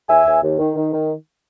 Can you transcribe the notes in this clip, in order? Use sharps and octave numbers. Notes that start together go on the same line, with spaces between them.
D#2 E5 G#5
D#2
D#2
D#3
D#3
D#3